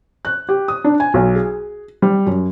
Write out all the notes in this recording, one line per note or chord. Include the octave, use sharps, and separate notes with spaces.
F#6
G4
D#6
D4
G#5
B1
G#4
G3
F#2